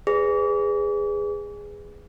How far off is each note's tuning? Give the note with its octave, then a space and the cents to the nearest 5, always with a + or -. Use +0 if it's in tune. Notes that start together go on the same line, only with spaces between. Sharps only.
G#4 -10 B4 +15 D5 -30